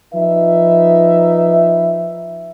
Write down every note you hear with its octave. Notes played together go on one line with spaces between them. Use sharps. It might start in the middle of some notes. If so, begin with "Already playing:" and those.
F3 D#4 B4 E5